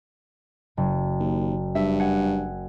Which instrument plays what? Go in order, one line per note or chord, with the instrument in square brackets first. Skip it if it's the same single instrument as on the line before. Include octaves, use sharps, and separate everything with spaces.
[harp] F#1
[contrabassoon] D#2
[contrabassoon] G2 [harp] E5
[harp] F#5 G#5